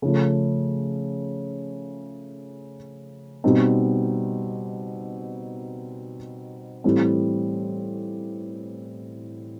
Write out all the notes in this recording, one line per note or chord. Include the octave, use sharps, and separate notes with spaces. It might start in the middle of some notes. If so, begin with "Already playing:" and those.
C#3 F3 A3
B2 G3 C4 D#4
A2 E3 G3 C4